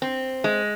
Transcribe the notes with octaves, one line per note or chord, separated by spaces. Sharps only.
C4
G#3